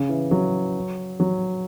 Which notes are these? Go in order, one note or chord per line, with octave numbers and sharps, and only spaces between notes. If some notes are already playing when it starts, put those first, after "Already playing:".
Already playing: C#3
E3
F#3
F#3